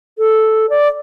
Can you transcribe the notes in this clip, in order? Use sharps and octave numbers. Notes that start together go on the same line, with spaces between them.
A4
D5